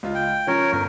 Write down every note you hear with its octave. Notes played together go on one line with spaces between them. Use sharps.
C#2 F4
G5
F3 C#4 A#4 C#5
G1 A#4